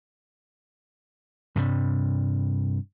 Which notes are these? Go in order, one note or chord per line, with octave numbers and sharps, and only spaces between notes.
G2 C3 G3